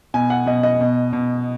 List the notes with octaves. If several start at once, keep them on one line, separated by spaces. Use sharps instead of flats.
B2 G#5
F#5
B2 D#5
D#5
B2
B2